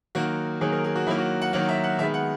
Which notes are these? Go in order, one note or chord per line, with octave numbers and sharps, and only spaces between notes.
D#3 F#3 A#3 F#4
D#3 F#3 A#3 G#4
A#4
G#4
F#4
D#3 F#3 A#3 E4
F#4
F#5
D#3 F#3 A#3 F#5
E5
F#5
D#3 G#3 B3 E5
F#5